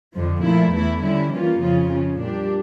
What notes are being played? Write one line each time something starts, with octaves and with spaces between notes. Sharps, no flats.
F2 D3 F3
A#2 F3 A3 E4
E2 E3 A3 E4
D3 G3 C#4 E4
E3 G3 A#3 C#4 F4
F2 C#3 F3 C#4 F4
C#3 F3 C#4
A#2 G3 D4 G4